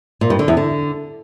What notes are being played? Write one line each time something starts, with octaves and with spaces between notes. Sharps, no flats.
A#2
G2
D3
E2
D3